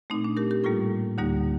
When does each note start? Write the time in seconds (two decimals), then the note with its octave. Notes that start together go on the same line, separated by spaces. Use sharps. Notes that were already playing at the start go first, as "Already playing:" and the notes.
0.10 A3 C4 D#4
0.14 A#2
0.24 D4
0.37 G4 A#4
0.51 G4 A#4
0.64 A2 G3 A#3 F4 A4
1.18 D2 D3 G3 A#3 D#4 G4